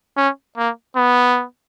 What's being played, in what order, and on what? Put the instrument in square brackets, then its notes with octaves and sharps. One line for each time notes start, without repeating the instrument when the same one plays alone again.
[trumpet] C#4
A#3
B3